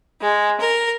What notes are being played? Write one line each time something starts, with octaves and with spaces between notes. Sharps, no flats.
G#3
A#4